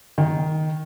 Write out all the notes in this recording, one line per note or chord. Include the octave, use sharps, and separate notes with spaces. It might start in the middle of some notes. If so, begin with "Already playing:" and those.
D#3